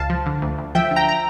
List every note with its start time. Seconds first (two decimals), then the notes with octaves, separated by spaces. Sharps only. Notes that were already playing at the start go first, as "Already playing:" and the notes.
Already playing: C#2 F5 A5
0.10 F3
0.26 D3
0.42 D2
0.58 D2
0.75 F3 E5 G5
0.91 D3
0.96 G5 A#5
1.09 A#5